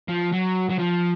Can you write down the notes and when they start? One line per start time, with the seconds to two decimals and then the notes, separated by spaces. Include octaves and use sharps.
0.08 F3
0.32 F#3
0.69 F#3
0.78 F3